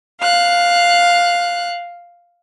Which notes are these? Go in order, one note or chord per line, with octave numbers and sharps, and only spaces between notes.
F5 F#6